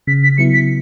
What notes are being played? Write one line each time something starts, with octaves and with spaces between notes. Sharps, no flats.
C#3 B6
B6
F#3 B3 E4 C#7
B6